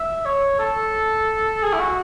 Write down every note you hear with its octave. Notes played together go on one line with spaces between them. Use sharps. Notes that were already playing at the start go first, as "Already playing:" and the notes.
Already playing: E5
C#5
A4
G#4
E4
F#4